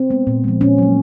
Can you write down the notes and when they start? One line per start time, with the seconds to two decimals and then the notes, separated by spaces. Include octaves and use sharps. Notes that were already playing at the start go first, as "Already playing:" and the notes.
Already playing: C4
0.10 G#3 B3
0.27 A#2
0.44 F3 G#3
0.61 A#2 C#4
0.78 F#3 A#3